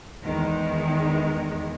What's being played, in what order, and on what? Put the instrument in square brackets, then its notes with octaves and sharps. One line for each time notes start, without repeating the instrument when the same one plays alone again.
[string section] E2 D#3 G#3